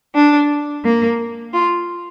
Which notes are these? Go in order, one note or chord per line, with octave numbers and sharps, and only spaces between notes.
D4
A#3
F4